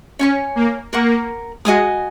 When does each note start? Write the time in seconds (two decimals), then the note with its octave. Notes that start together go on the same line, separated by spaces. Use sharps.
0.19 C#4 C#5 G#5 C#6
0.56 A#3
0.93 A#3 A#4 F#5 C#6
1.65 G#3 F#4 D#5 G#5 D#6